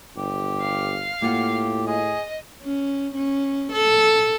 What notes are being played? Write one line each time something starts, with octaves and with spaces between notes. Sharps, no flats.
G1 G4
F5
A2 A#3 F4 G4 F#5
G#4 D#5
C#4
C#4
A4